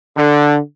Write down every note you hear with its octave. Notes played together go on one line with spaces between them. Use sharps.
D3